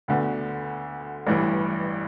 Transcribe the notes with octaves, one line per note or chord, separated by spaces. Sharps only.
D2 D3 B3
A1 G2 E3